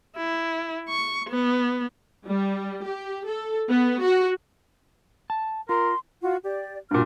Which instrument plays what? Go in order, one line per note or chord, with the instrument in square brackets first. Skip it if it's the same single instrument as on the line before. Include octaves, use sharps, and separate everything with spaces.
[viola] E4
C#6
B3
[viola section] G3
G4
A4
B3
F#4
[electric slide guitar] A5
[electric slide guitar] F4 [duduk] A#4 [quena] C6
[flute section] F4 F#4
G4 D5
[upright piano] G2 A#2 [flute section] F#4 F6